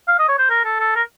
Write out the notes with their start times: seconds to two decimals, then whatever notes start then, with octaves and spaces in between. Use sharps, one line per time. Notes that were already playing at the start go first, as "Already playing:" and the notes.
0.08 F5
0.19 D#5
0.29 C#5
0.39 C5
0.50 A#4
0.64 A4
0.80 A4
0.95 A#4